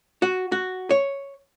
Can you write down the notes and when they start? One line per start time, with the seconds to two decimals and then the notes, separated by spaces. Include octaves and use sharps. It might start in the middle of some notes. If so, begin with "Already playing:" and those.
0.22 F#4
0.52 F#4
0.90 C#5